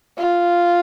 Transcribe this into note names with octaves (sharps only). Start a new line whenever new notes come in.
F4